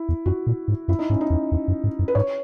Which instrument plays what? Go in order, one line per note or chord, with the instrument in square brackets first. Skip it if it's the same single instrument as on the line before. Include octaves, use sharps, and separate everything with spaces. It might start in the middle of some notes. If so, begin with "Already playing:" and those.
Already playing: [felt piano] E4
[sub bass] E2
[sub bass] F#2 [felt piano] F#4
[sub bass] A#2
G#2
[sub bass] F#2 [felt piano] E4
[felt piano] D#4
[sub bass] G#2 [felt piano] C#4
[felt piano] D#4
[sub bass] E2
E2
F#2
G#2
F#2
[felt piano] B4
[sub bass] G#2 [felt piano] C#5